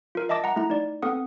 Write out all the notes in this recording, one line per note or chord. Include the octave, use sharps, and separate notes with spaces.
F4 A#4
D#5 E5 A5 D6 A#6
F#5 A#5
A3 E4 A#5
D#4 D5
B3 C4 A4 F#5 D#6